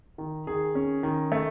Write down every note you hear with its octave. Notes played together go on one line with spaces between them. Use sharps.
D#3
D#3 G#4
C#4
D#3
A3